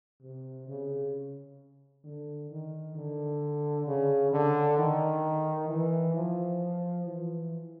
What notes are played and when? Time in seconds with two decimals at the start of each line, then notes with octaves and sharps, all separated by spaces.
0.22 C3
0.68 C#3
2.04 D3
2.50 D#3
2.95 D3
3.86 C#3
4.32 D3
4.78 D#3
5.69 E3
6.15 F3
7.06 E3